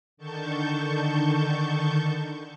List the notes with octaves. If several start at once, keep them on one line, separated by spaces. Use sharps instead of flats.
D3 D#3 A5 C#6 G6